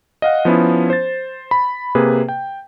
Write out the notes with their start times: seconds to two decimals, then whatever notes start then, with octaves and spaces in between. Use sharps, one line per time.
0.22 D#5 F5 F#5
0.45 F3 B3 C#4 E4
0.90 C5 A6
1.51 B5
1.95 C3 A#3 G#4 B4
2.29 G5